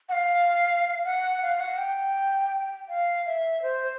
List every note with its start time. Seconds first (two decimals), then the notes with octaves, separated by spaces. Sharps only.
0.09 F#5
0.13 F5
1.05 F#5
1.42 F5
1.60 F#5
1.78 G5
2.89 F5
3.26 E5
3.63 C5